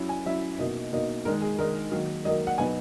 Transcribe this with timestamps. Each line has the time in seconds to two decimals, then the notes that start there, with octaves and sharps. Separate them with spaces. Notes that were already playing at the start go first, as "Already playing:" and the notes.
Already playing: F#3 C#4 E4
0.09 G#5
0.26 F#3 C#4 E4 E5
0.59 B2 A#3 D#4 D#5
0.92 B2 A#3 D#4
1.25 D#3 G#3 D#4 A#4
1.42 G#4
1.58 D#3 G#3 D#4 A#4
1.92 D#3 F#3 A#3
2.25 D#3 F#3 A#3 D#5
2.47 F#5
2.58 B2 F#3 B3 D#4 G#5